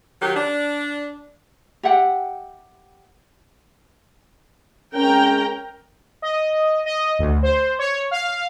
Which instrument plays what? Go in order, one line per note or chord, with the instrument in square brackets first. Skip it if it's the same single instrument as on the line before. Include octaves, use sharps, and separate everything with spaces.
[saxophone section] D#3 F#3 G4
D4
[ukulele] G4 E5 F#5 G5
[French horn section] G#3 C4 C#4 [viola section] A#4 G5 A#5
[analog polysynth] D#5
D#5
D2
C5
C#5
F5